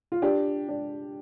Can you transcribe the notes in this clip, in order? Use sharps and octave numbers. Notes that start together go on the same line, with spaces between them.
F4
D4 G4
D4